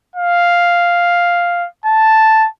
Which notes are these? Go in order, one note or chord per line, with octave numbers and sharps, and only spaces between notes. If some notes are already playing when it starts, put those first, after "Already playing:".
F5
A5